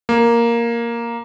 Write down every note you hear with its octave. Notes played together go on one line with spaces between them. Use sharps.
A#3